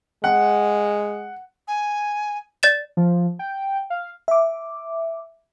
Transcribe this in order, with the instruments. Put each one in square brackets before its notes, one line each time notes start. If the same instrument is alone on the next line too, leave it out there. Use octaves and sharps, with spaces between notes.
[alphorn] G#3 [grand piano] F#5
[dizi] G#5
[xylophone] D5 A6 E7
[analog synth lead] F3
G5
F5
[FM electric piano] E5 D6